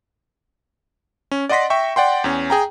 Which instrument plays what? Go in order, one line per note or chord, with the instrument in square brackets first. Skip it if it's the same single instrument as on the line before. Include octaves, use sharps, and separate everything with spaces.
[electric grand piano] C#4
D5 D#5 F#5 C6 A#6 B6
E5 G5 C#6
D5 F#5 G5 C6
E2 C#4
G#4 G5 A#5